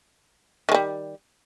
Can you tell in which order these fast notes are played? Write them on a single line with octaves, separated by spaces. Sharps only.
D#3 G#3 G3